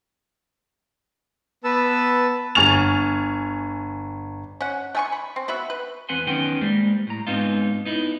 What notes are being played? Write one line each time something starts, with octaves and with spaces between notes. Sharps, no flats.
B3 B4 A5 E6
G1 G#5 C#6 F6 A6 F7
C#4 F#5
A3 G#5 C#6
B5
C4
B3 F#4 B4 E5
B4
E2 C4 B4 F#5 G#5 C6
F#2 D#3 B3 C#4 G5 C6
G3 G#3 A#3 C5
A2 A#5
G#2 B3 C4 D#4 F4
B3 D#4 E4